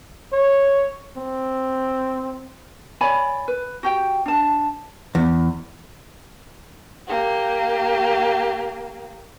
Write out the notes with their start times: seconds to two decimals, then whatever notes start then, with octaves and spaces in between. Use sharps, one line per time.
0.32 C#5
1.16 C4
3.01 C#5 D5 G#5 B5
3.48 B4
3.83 F#4 G4 G5
4.26 D4 A5
5.15 E2
7.08 A#3 G4